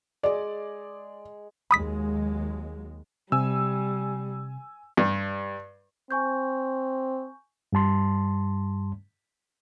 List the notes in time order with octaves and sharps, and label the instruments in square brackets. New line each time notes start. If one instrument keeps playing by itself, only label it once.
[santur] G#3 G#4 [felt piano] D5
[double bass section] D#2 F#3 G#3 [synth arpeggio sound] B5 D#6 B6
[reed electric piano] C3 [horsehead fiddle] G3 [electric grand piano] G#5 E6
[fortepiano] G2
[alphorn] C4 [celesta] G#5 C#6 G6
[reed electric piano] G2 G3 A5 C6